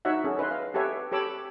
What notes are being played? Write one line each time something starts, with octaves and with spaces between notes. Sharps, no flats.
D#4 F#4 C#5 E5 F#5
C#4 G#4 A4
B4 D#5 E5 C6
F5
G4 A4 B4 C#5 E5 G#5
G4 A4 C#5 B5 D6 E6